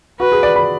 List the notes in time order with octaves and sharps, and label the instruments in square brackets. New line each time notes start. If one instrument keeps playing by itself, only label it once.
[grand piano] F#4 [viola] B4
[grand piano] G#4
D5
B5